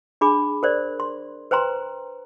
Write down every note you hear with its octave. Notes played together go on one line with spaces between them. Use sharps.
D4 G#4 B5 D6
A#4 C5 D5
C6
B4 C5 G5 A#5 C6